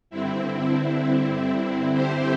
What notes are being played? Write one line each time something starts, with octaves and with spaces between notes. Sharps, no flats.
G2 D3 C4 E4
C4 E4
G4 C5